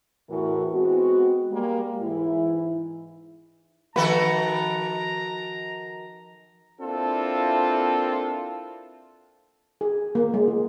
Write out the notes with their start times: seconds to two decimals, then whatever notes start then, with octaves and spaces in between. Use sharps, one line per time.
0.30 E2 A2 E3 E4 F#4 A#4
0.74 G#3 B3 C4 F#4
1.51 G3 G#3 A#3
2.01 G#2 E3 E4
3.96 D#3 F3 F#4 A4 B4 A#5
6.81 A#3 C4 D4 E4 F4 A4
9.81 G#4
10.15 A#3
10.34 G#3
10.48 F4